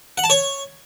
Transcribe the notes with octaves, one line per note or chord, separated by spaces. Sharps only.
F#5
A5
C#5